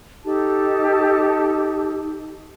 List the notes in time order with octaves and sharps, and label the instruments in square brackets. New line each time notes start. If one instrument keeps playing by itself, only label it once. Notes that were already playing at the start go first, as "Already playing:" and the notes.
[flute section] D#4 G4 A4 A5